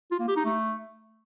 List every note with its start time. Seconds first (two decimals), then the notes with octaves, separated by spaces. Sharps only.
0.11 F4
0.19 A#3
0.28 G4
0.36 D#4
0.45 A3